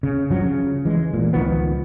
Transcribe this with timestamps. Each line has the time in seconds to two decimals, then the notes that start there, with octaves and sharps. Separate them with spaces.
0.03 C#3
0.30 G2 F3 F#3
0.44 C#3
0.85 E3 G#3
1.14 A1 A#2
1.33 C#2 D#3 F3 B3